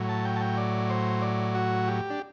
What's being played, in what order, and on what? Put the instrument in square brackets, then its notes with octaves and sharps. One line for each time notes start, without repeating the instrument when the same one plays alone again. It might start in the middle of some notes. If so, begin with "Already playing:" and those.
Already playing: [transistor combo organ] A2 F#3
A5
G5
A5
G5
D5
C5
D5
F#4
G4
D4